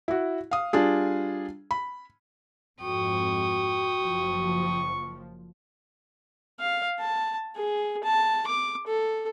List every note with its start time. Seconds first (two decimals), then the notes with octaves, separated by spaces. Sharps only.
0.08 E4 F#4
0.51 F5 D#6
0.73 G3 D4 F4 G#4
1.71 B5
2.81 F2 G#2 F#4 G5 C#6 D#6
4.02 F#1 F3
6.60 F5
6.99 A5
7.56 G#4
8.04 A5
8.47 D6
8.87 A4